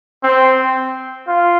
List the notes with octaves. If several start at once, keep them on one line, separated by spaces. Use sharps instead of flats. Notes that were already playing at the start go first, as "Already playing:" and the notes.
C4
F4